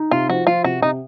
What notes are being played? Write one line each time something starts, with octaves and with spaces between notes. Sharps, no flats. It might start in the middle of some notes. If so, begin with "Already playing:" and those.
Already playing: D#4
C3 F4
F3 F#4
F3 F4
C3 F#4
C3 D#4